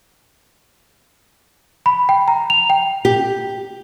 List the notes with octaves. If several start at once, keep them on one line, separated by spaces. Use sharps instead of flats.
B5
G5
A#5
F7
G5
G4